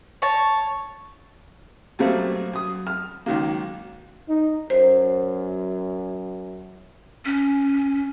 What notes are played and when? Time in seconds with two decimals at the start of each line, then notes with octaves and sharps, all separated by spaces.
0.22 C#5 A5
1.99 F#2 B2 G3 A3 A#3 C4
2.53 F#2 D#6
2.87 F6
3.26 C#2 D#3 F#3 A#3
4.28 D#4
4.70 F#2 C5
7.25 C#4